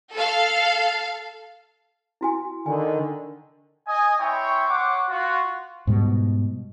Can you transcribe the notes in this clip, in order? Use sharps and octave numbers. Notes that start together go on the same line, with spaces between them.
A4 F5
E4 F#4 G#5
D3 D#3 G#5
D#5 G#5
C4 E4 C#5 G5 C#6
C5 C#5 F#5 D6
F4 F#4
G#2 B2 G3